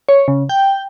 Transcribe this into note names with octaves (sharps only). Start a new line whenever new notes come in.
C#5
C#3
G5